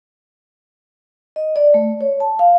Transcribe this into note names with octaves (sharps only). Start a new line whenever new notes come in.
D#5
D5
A3
C#5
A5
F5